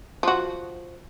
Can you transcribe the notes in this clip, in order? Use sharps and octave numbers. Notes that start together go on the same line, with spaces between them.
F3 F#4